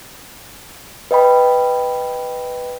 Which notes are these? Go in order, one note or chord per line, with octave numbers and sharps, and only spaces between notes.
B4 D#5 G5 B5